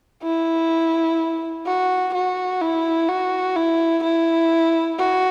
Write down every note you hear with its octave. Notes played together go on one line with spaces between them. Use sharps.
E4
F#4
F#4
E4
F#4
E4
E4
F#4